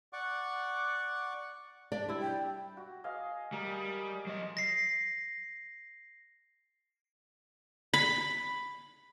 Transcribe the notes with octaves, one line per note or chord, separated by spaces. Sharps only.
D5 F#5 C#6 D6
D4 D5 E5
G3 E4
G5
F#4
G#4 D#5 F5
G3 G#4 A#4
F#3 D#5
A#6 C7
B5